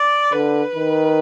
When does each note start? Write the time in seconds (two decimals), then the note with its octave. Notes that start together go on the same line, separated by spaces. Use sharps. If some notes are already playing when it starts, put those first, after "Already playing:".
Already playing: D5
0.32 D3 B4
0.75 D#3